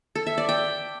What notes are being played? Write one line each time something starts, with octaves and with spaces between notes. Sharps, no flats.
A4
E5
D5
G5